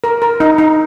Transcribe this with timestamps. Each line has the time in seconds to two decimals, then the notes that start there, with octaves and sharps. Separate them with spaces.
0.04 A#4
0.22 A#4
0.40 D#4
0.58 D#4